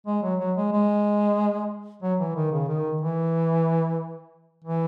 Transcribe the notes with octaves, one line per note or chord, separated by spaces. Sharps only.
G#3
F#3
F#3
G#3
G#3
F#3
E3
D#3
C#3
D#3
E3
E3